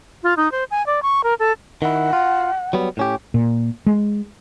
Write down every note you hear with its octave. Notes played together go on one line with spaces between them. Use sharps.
F4
D#4
C5
G#5
D5
C#6
A#4
A4
D#3 E4 F#5
F4
F#3 G3 B3
A2 C#4 G4
A#2
G#3